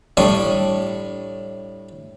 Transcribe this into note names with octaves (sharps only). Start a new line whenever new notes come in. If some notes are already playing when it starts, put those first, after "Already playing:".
A2 G3 D4 C#6 D#6